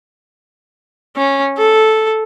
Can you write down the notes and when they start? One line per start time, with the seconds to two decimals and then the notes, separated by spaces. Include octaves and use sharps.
1.16 C#4
1.58 A4